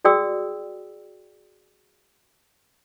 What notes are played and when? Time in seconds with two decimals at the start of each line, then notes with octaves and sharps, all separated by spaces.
0.05 F#4 G#4 D5 G5 D#6 E6